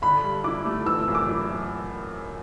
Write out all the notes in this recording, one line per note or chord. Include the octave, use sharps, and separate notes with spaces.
D3 B5
G2
E4 D6
A3
E3 E6
F#2
D6
E4